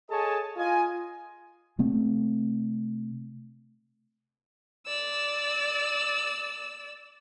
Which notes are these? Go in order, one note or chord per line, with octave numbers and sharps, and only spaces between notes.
G#4 A4 C#5 D#5 G#5 A5
F4 D#5 G#5
C3 A3 C4
D5 E6